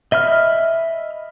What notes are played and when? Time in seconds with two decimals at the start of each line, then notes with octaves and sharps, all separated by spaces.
0.12 D#5 E5 B5 F6